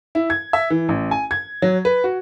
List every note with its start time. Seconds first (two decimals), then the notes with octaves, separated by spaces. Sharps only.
0.15 E4
0.30 G#6
0.53 E5
0.70 E3
0.89 A1
1.11 G#5
1.31 G#6
1.62 F#3
1.85 B4
2.04 F#4